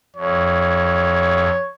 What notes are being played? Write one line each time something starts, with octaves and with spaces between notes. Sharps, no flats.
F2 C#5